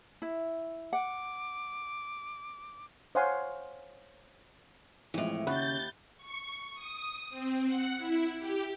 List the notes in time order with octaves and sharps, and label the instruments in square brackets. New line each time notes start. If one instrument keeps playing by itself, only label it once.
[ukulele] E4
[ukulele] F#5 [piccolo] D6
[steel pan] C5 C#5 F5 F#5 G#5 C6
[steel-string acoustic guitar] F2 A2 [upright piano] E3 F3 G#3
[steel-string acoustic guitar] D#2 [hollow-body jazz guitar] C#3 [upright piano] F#5 B5 F#6 [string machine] G6 A6
[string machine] C#6
D#6
C4
F#5
E4
G4